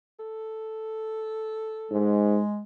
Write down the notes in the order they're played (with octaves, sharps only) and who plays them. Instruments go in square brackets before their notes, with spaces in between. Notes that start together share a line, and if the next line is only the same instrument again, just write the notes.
[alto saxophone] A4
[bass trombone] G#2 [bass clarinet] G#3